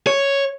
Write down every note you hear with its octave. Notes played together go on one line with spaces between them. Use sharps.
C#5